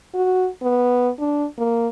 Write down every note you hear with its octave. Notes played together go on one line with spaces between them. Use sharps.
F#4
B3
D4
A#3